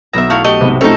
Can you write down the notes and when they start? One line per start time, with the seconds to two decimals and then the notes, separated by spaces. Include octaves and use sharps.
0.13 B1 B3 E5 A#5 E6
0.30 A3 E4 F5 C#6
0.44 A3 G4 D#5
0.61 G#2 C3 B3
0.81 F3 A3 C4 C#4 D#4 A4